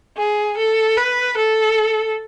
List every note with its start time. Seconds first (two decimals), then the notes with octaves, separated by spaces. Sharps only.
0.17 G#4
0.57 A4
0.97 B4
1.37 A4